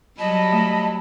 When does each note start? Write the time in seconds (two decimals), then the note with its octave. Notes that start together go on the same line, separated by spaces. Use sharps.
0.19 F#3 G3 D#5 A5 B5
0.53 A3